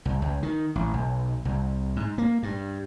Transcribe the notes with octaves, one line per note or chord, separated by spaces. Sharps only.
C2
C#2
D#3
A1
B1
C2
G#2
A#3
G2